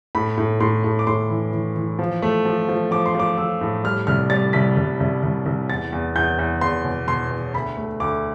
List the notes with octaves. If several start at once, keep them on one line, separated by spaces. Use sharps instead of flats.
A2 B5
A2
A2 C6
A2
D6
A2 C6
E3
E3
E3
F3
A3
F3
F3
F3 D6
C6
F3 D6
F3 E6
A2
G3 F6
C2 F6
G3 A6
C2 B6
C2
C2
C2
C2
E2 A6
E2
E2 G6
E2
E2 C6
B2
B2 C6
E2
D2 B5
A3
D2 D6